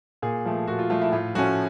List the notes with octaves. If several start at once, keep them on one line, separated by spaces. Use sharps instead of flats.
A#2 G#4
F3 A3
A#2 F#4
F4
F3 A3 F4
E4
A2 F4
F3 A3 C#4 F#4